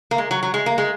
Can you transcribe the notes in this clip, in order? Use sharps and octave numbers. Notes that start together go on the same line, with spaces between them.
A#3
G#3
F#3
F#3
G#3
A#3
G#3